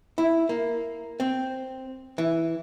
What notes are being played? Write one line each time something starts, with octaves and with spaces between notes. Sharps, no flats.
E4
A#3
C4
E3